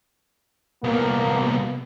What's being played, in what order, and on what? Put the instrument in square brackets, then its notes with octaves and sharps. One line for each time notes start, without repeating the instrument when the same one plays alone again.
[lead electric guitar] C2 B3 [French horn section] A#3